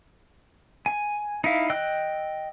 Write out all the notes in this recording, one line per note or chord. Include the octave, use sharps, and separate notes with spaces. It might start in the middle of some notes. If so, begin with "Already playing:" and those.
G#5
D#4 E4 F5
D#5 G5 E6 F#6